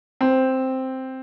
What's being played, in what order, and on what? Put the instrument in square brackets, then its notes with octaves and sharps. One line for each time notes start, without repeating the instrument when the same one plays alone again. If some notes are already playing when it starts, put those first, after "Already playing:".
[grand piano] C4